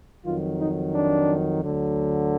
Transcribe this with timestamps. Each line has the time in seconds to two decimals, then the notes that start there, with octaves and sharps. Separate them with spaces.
0.25 F2 D#3 F#3 F4
0.59 D#4
0.93 D4
1.61 D2 D3 F#3